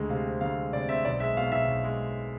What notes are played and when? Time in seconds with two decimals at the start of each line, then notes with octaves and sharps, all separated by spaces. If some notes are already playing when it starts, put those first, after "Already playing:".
Already playing: D2 G#3
0.09 C3 F5
0.25 C4
0.41 D2 F5
0.57 G#3
0.73 C3 D5
0.89 C4 E5
1.05 B1 D5
1.20 G#3 E5
1.37 B2 F5
1.52 B1 E5
1.68 B1
1.84 G#3